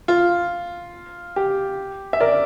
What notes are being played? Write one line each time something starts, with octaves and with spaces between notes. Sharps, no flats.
F4
G4
E5
A#4 D5